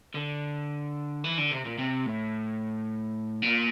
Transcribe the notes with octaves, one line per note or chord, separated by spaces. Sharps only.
D3
E3
D3
C3
A#2
C3
A2
A#2